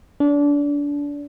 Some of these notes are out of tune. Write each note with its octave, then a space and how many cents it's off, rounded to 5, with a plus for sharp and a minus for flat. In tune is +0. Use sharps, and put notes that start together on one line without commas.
D4 -25